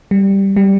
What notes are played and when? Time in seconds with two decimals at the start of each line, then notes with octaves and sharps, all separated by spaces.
0.11 G3
0.56 G3